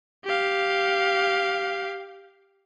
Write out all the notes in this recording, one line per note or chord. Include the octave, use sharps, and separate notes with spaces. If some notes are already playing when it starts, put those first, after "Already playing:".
G4 F5